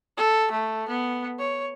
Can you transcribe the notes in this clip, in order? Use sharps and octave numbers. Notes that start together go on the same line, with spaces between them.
A4
A3
B3
C#5